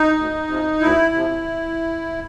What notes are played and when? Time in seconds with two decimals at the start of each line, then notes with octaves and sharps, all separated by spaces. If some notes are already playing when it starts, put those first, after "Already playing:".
Already playing: D#4
0.16 D2
0.47 C3 F3
0.81 D2 E4
1.14 C3 F3